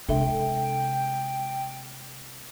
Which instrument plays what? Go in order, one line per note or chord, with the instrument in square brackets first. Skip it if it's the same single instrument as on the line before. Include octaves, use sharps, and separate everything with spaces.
[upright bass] C3 G#3 [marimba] D4 A4 E5 [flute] G5